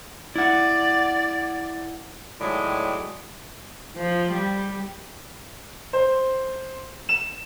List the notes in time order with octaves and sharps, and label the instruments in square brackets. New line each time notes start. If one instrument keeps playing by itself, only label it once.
[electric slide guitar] E4 F#5 [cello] D5
[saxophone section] A2 D#3 F#3 G#3 D5
[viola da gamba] F3
G3
[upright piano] C5
E7